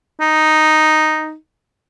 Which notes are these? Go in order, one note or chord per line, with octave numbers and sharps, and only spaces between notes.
D#4